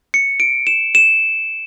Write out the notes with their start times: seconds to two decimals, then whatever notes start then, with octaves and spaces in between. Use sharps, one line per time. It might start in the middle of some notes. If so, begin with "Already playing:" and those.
0.14 C#7
0.40 D7
0.67 E7
0.95 E7